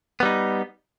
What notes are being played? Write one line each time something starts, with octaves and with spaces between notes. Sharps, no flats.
G3 B3 D#4